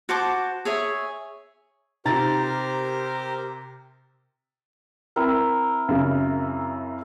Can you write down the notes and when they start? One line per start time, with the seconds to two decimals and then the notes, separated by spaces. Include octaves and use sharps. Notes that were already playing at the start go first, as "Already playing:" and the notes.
0.09 F#4 C5 A5 D6
0.65 G#4 C#5 E5
2.05 C3 D#4 F4 G4 A#4 C5 A#5 A6
5.16 C4 E4 A#4
5.88 F#2 C#3